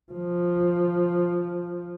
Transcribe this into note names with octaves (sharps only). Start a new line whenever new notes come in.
F3